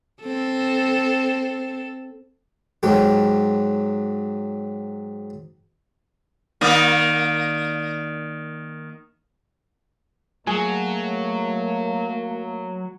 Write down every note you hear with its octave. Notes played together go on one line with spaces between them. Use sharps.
C4 A4
G#2 F#3 G4
D#3 A#3 D5
F#3 A3 A#3 G#4